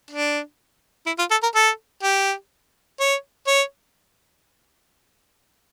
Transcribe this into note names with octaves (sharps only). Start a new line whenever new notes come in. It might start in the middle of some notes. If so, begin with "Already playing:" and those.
D4
E4
F4
A4
A#4
A4
G4
C#5
C#5